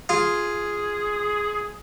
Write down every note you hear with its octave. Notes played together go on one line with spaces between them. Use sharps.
F4 G#4